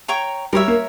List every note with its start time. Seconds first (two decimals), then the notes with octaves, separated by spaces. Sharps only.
0.08 C#5 G5 A#5 C#6
0.53 G3 A#4 C#5 E5
0.68 A#3